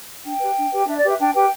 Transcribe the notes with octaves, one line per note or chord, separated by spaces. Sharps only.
D4 G5
G4 B4
D4
G4 B4
D4 E5
D5
G4 B4 E5
D4 G5
G4 B4 G5